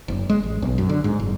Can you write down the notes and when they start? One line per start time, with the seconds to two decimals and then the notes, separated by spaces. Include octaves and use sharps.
0.08 F#1
0.30 G#3
0.43 A1
0.62 B1
0.78 F#2
0.89 D3
1.04 G#2
1.20 F#1